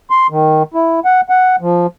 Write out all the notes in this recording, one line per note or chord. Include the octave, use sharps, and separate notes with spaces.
C6
D#3
E4
F#5
F#5
F3